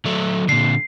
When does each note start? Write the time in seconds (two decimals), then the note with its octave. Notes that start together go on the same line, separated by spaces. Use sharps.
0.06 F#3 A3
0.49 A#2 D3 C7